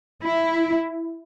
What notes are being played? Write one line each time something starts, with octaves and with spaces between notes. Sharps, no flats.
E4